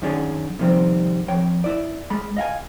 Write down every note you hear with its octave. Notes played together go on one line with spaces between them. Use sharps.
F#2 D#3 C#4 D4 G#4
C3 D#3 F3 G3 C4
F2 C#5 G5
E4 D5
G#3 B5
D#5 F5 F#5 G#5